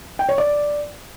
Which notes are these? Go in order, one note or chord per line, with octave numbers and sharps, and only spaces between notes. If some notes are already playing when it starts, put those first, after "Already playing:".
G5
C#5
D5